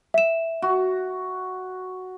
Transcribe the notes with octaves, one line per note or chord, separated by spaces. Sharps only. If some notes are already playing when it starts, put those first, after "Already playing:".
E5 E7
F#4